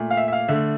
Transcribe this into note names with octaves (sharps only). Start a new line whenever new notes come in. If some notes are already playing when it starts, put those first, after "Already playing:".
Already playing: A#2 A3
F5
E5
E5
F5
D3 A3 E5